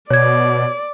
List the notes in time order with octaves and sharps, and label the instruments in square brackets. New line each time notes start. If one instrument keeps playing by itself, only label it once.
[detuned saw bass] B2 [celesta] C#5 G#6 [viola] D5